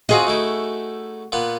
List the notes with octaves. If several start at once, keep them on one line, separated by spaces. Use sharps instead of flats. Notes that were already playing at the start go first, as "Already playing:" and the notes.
C4 F4 F#4 G#4 D#5 F#5
A3 D#4 E4
A#2 B3 F#5